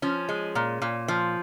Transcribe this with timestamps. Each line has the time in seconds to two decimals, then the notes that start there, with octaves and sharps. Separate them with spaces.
0.02 F3 C#4
0.29 G#3
0.55 A#2
0.82 A#2
1.08 F3